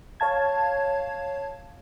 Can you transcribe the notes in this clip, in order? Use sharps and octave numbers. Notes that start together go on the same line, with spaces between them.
C#5 F5 A5 G#6